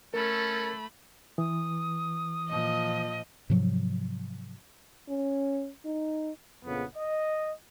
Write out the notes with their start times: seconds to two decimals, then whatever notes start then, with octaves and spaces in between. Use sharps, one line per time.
0.14 A3 C#4 A4 A#4 B5
1.38 E3 D#6
2.49 A#2 F3 D#5
3.50 G#2 C3 F3 F#3
5.09 C#4
5.85 D#4
6.65 A#1 F2 C#3 B3
6.95 D#5